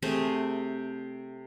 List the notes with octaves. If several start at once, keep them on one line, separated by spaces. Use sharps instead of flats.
C3 A3 G#4 C5